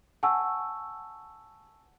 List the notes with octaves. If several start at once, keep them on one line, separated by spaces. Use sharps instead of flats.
F#5 G#5 A5 C#6 E6